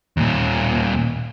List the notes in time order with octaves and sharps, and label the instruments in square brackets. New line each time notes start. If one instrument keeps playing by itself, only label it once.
[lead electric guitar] D#2 A#2